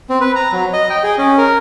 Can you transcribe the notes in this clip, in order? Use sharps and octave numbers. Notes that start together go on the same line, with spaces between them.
C4
B4
A#5
F#3
D#5
G5
G#4
C#4
A#4